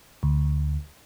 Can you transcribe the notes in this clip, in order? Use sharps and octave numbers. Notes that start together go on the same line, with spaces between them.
D2